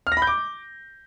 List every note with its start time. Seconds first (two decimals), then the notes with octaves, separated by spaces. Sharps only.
0.07 F6
0.12 A#6
0.17 B5
0.22 G6
0.27 D6